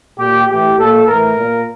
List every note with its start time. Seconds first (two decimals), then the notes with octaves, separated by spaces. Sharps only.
0.18 A#2 G4
0.47 A2 E3 G4
0.77 A#2 A4
1.07 A2 E3 A#4
1.37 A#2